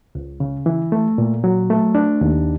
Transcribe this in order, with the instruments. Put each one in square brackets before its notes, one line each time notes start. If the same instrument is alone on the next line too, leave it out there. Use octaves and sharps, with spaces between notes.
[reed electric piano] C#2
C#3
E3
A3
A#2
F#3
A3
D4
D#2